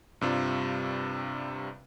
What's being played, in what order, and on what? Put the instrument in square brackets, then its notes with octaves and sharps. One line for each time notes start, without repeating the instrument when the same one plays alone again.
[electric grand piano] G2 C3 G3 F4